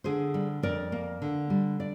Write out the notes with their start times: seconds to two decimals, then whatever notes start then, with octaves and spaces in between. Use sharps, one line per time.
0.04 D3 G#4 C5
0.34 G3
0.63 F2 A#4 D5
0.92 A#3
1.22 D3
1.50 G3
1.80 D5